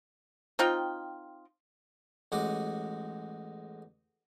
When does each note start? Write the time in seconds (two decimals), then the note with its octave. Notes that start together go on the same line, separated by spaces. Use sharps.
0.59 C4 D#4 F4 G5
2.32 A1 G#3 D#4 F#4 D6